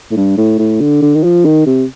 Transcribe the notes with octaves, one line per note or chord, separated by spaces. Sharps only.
A2
G2
A2
A2
D3
D3
D#3
F3
D#3
C3